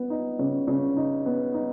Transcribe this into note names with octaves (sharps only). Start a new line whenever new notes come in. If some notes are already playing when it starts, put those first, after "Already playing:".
Already playing: B3
D#4
C#3
C#3
D#4
B3
D#4